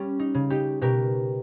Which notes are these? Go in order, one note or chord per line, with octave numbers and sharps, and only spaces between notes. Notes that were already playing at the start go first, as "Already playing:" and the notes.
Already playing: G3 C#4
D#4
C#3
D#4 G4
B2 G4 A#4